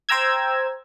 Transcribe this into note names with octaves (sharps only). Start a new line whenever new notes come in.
C5 G5 A#5 E6 G#6